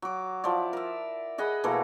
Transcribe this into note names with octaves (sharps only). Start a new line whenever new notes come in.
F#3 D6
F3 E4 D5
A#4 E5
G#4 D#5 F#5 B5
B2 E3 A3 A#3